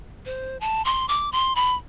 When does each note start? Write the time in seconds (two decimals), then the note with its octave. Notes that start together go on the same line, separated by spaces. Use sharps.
0.26 C5
0.61 A5
0.85 C6
1.08 D6
1.32 C6
1.55 B5